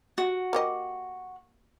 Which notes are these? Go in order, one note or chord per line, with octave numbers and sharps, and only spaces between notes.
F#4
A#3 G4 D#5